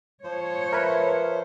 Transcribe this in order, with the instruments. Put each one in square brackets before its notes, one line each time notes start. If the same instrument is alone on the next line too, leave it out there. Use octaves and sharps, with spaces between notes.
[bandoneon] F3 C5 [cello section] C#5
[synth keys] A#4 B4 [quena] E5